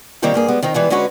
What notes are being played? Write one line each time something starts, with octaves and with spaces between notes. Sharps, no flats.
D#3 G3 A#3 C4 G4 C#5
G2 A#3 G#4
G3 G#3 B3
D#3 C4 D#4
E3 G3 G#3 B3
D3 G#3 C#4 F#4 B4